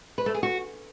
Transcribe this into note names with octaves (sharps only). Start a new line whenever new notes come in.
B4
A3
G#4
F#4